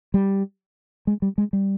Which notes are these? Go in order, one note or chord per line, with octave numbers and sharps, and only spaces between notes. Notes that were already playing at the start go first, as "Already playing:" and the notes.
G3
G#3
G3
G#3
G3